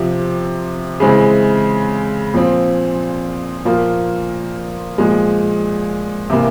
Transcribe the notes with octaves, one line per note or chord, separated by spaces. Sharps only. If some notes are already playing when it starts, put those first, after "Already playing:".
Already playing: C3 F3 C4 G4
C#3 E3 G#3 C4 E4
A#2 F3 C4
A#2 F3 A#3 F4
A#2 F3 G#3
C3 E3 A#3